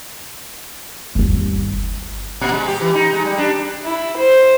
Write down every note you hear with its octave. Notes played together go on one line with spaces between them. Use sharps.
G1 D#2
A#2
G#3
G4
E3
D#4
G#3
G3
D4
E4
C5